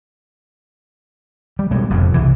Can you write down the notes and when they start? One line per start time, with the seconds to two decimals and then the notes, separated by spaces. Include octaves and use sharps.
1.59 G3
1.71 B2 G3 G#3 A#3
1.90 F1 F2 G#2
2.14 C2 C3 E3